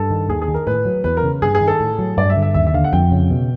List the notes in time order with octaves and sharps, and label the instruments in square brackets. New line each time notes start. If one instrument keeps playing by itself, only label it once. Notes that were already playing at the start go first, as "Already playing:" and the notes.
Already playing: [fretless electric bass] G2 [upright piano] A4
[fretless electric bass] D#3
[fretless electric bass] D#2 [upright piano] G#4
[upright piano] G#4
[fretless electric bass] D#3
[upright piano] A#4
[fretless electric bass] A2 [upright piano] B4
[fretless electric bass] F#3
[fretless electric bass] E2 [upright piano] B4
[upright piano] A#4
[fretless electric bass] C#3
[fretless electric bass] G2 [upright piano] G#4
[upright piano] G#4
[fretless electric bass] D#3
[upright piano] A4
[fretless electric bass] A2
F#3
[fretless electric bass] G2 [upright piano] D5
[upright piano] E5
[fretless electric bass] D3
[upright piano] E5
[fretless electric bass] D#2 [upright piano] E5
[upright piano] E5
[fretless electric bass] D3 [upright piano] F5
[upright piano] F#5
[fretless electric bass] F2 [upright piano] G5
[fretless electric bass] C#3
B2